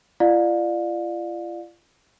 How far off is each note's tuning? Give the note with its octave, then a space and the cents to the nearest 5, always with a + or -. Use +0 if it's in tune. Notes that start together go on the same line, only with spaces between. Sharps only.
F4 -40 D5 +25 F5 +30